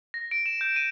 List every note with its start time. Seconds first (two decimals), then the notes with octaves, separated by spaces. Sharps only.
0.14 A#6
0.31 D7
0.46 E7
0.61 G6
0.76 D#7